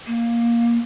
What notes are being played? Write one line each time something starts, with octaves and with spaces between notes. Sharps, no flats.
A#3